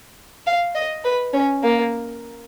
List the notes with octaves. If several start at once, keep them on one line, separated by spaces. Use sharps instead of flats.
F5
D#5
B4
C#4
A#3